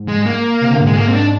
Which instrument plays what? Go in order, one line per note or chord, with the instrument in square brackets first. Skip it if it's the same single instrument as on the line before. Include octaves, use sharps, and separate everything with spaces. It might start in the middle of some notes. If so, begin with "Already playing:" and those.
Already playing: [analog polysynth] G#2
[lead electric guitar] G#3
A#3
[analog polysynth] C3
D3
G#2
[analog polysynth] A#2 [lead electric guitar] G#3
[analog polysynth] G#2 [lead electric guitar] A#3
[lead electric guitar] C4
D4